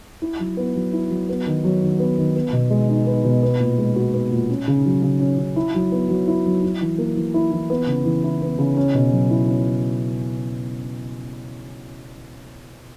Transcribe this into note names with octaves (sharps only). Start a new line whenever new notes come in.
E4
F#3
B3
F#3
E4
F#3
B3
D#3
F#3
D#3
B3
D#3
B3
B2
G#3
D#4
B3
B2
B3
A#2
G#3
F#4
B3
A#2
C#4
C#3
F#3
C#3
C#4
C#3
E4
F#3
B3
F#3
E4
F#3
E4
E3
A#3
E3
E4
E3
B3
C#3
E3
E4
B3
C#3
C#4
B2
F#3
E4
C#4